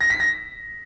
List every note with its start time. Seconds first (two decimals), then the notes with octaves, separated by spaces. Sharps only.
0.01 A#6
0.10 B6
0.20 A#6